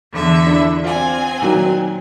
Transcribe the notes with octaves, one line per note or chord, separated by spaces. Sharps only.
E2 D3 E5
D4 E4
C4 F4 D5 G#5
A#2 D#3 F#3